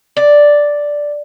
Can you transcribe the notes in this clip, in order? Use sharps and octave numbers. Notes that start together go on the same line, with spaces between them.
D5